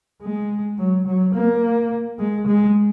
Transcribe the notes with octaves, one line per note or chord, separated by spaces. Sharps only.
G#3
F#3
F#3
A#3
G#3
G#3